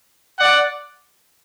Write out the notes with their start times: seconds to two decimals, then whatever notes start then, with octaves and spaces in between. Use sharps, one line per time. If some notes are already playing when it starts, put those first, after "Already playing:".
0.39 D5 F#5